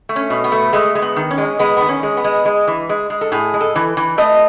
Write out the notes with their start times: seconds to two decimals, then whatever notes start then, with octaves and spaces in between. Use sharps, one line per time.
0.09 A3
0.16 C#4
0.30 B2
0.44 B3
0.52 A3
0.73 G#3 A3
0.95 G#3
1.02 B3
1.16 D#3
1.31 C#4
1.38 G#3
1.59 G#3 B3
1.77 D#3 B3
1.89 C#4
2.03 G#3
2.17 B3
2.24 G#3
2.45 G#3
2.67 E3
2.89 G#3
3.10 G#3
3.21 A4
3.32 A2 G#4
3.54 G#3
3.61 A4
3.76 E3
3.97 E3
4.18 A3 D#5